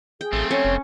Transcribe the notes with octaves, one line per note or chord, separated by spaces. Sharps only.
G#4 G5
A1 A3 C4
C#4 A4 C#5
F1